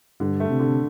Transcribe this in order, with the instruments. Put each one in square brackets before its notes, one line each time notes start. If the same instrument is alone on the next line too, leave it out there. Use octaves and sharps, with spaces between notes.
[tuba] G2 [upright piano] D3
[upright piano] A3
[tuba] C3
[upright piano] D3